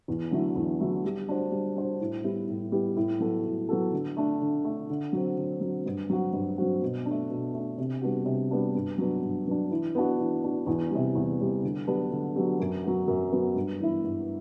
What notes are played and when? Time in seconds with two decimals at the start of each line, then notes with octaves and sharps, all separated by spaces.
0.08 E2
0.31 D3 F#3 A3 E4
0.55 E2
0.80 D3 F#3 A3 E4
1.04 G3
1.29 D4 F#4 C5
1.51 G3
1.77 D4 F#4 C5
2.00 A2
2.24 G3 B3 E4 G4
2.49 A2
2.72 G3 B3 E4 G4
2.96 A2
3.20 F#3 B3 F#4 A4
3.45 A2
3.69 F#3 B3 F#4 A4
3.93 D3
4.17 A3 D4
4.41 D3
4.64 A3 D4
4.90 D3
5.13 F#3 C4
5.38 D3
5.61 F#3 C4
5.86 G2
6.10 F#3 C4 F#4
6.33 G2
6.58 F#3 C4 F#4
6.82 B2
7.06 A3 D4
7.30 B2
7.54 A3 D4
7.78 C3
8.02 G3 B3 D4 F#4
8.26 C3
8.51 G3 B3 D4 F#4
8.75 G2
8.98 F#3 B3 D4
9.22 G2
9.47 F#3 B3 D4
9.71 E3
9.95 B3 D4 F#4
10.19 E3
10.43 B3 D4 F#4
10.66 E2
10.91 C3 G3
11.15 E2
11.40 C3 G3
11.63 D3
11.87 F#3 B3 D4 G4
12.12 D3
12.36 F#3 B3 D4 G4
12.60 F#2
12.84 F#3 B3 F#4
13.08 F#2
13.32 F#3 B3 F#4
13.55 G2
13.80 E3 B3 E4
14.04 G2